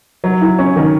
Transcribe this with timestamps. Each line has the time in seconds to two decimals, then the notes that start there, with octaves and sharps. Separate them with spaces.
0.24 F#3
0.41 E4
0.59 C#4
0.76 D#3